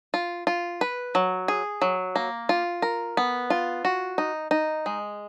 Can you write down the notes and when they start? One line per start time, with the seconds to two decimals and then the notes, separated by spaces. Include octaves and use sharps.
0.14 F4
0.47 F4
0.81 B4
1.15 F#3
1.48 G#4
1.82 F#3
2.16 A#3
2.49 F4
2.82 A#4
3.17 B3
3.50 F4
3.85 F#4
4.18 D#4
4.51 D#4
4.86 G#3